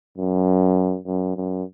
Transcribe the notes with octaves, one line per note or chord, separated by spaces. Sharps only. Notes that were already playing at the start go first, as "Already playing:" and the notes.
F#2
F#2
F#2